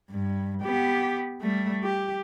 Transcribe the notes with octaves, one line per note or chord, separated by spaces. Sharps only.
G2
B3 G4
G3 A3
G4